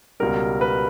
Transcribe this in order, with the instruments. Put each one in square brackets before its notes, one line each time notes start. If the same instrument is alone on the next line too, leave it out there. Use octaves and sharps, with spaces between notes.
[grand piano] C#2 B2 G3 A#4
B4